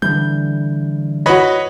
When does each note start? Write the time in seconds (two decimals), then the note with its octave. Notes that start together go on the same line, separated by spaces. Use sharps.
0.02 D3 E3 G3 G6
1.26 F#4 B4 C#5 D#5 B5